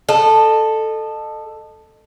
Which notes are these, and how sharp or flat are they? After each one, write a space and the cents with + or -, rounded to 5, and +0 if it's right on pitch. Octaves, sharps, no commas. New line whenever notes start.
A4 +0 D#5 -30